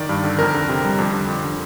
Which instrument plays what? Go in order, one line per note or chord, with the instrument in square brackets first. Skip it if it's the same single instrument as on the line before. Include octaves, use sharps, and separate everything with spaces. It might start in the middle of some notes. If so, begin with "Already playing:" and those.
Already playing: [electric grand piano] D#3 D5
G2
D3
F2 A#4
D3
C3
G3
F2
D3
F2
D3